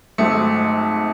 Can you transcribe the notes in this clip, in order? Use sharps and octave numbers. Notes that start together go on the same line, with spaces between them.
G#1 G#2 F#3 A3